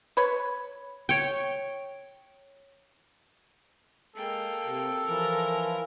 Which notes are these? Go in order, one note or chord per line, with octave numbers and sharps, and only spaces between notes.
B4 C#5
C#5 G5
G#3 A#3 A4 G5
C3
E3 F3 A#4